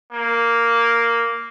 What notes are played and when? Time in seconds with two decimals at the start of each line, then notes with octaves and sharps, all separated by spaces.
0.13 A#3